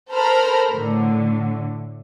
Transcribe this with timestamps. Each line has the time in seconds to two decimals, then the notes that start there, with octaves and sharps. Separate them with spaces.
0.11 A4 A#4 C5 A#5 B5 F6
0.72 A2 D3